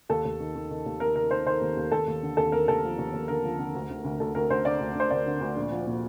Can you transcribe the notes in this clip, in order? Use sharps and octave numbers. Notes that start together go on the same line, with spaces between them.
D#2 A4
D#2
D#3
D#3
D#3
D#2
D#3 A#4
D#3 A#4
D#3 C5
D#3 C5
D#2
D#2
D#2 A4
D#2
D3
D#2 A4
D#2 A#4
D#2 A4
F3
D#2
D#2
D3 A#4
F3
D3
D2
D2
D2
D2 A4
D2 A#4
D2 C5
D3 D5
D2
D2 C5
D2 D5
D3
D2
A#1
F3
A#2